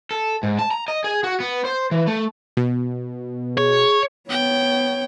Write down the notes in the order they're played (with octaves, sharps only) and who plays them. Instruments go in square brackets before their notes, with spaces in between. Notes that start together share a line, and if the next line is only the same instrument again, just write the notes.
[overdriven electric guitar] A4
G#2
A5
A#5
D#5
G#4
F#4
B3
C5
E3
A3
[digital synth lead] B2
[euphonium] G#4 [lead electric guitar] C#5
[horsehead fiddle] B3 C#5 [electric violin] G5